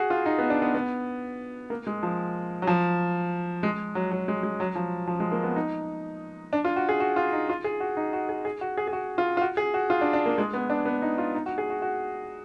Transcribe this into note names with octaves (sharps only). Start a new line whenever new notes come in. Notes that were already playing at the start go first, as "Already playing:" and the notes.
Already playing: F#4 G#4
F4
D#4
B3
D4
B3
B3
A#3
G#3
F3
F#3
F3
G#3
F#3
F#3
G#3
G#3
F#3
F3
F3
G#3
A#3
B3
D#4
D4
F4
F#4
G#4
F#4
F4
D#4
F4
G#4
F#4
D#4
F#4
G#4
G#4
F#4
G#4
G#4
F#4
F4
F4
F#4
G#4
F#4
F4
D4
D4
A#3
G#3
B3
D4
B3
D#4
F4
D#4
F#4
G#4
F#4
F#4